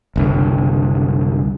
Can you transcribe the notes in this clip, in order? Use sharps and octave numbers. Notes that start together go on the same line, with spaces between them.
F#1 C2 D3